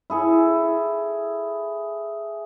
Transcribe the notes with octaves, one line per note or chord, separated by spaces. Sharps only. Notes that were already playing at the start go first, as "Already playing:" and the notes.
E4 G#4 A4